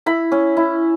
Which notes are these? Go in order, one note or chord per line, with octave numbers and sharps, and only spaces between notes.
E4 B5
C#4
E4